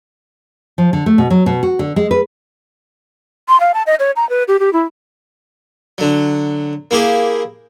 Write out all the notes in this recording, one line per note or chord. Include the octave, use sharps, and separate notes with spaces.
F3
D3
A3
B2
F#3
B2
F#4
D3
G#3
B4
C6
F5
A5
D#5
C#5
A#5
B4
G4
G4
E4
D3 F#3
A#3 E4 G4 G#4